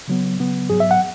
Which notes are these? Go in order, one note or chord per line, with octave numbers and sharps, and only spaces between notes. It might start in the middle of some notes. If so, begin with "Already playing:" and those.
C#3 F#3 B3
C#3 F#3 B3
G#2 F#3 B3 G#4
E5
F#5